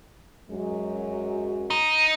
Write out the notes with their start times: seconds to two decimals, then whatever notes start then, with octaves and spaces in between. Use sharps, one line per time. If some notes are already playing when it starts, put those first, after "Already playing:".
0.49 F#2 F#3 G#3
1.70 D#4